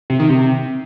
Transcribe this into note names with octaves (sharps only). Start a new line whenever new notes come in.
C3
D#3
C3